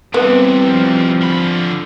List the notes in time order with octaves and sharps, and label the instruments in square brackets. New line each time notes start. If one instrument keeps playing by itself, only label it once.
[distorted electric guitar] C3 E3 [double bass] G3 C4 [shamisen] B3
[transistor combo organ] F3
[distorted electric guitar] D3 B5